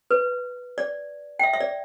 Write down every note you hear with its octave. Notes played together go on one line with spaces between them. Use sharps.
B4
D5
G5
E5
E5
D5